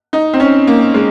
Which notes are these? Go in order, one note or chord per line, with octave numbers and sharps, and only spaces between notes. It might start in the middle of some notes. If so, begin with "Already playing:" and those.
D#4
C4
C#4
A#3
G#3